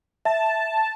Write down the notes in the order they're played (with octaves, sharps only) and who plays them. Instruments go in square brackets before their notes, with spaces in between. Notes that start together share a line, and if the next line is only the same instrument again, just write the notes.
[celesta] E5 [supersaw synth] A5